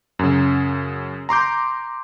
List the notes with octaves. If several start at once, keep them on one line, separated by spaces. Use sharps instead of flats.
F#2 C#3
A#5 C6 D6 G6